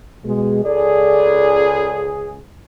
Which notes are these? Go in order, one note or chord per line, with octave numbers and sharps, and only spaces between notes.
B2 G#3
C#2 G#4 A4 D5